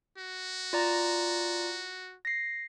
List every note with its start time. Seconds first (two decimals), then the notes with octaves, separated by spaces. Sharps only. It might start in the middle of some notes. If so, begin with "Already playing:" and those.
0.18 F#4
0.73 F4 D5 A#5
2.25 A#6 C7